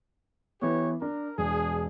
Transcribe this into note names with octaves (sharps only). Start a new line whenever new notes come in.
E3 B3 G4 B4 C#5
D4 A#4
E1 D4 G#4